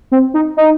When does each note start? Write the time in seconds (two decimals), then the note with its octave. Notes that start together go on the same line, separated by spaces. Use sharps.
0.12 C4
0.34 D#4
0.57 D#4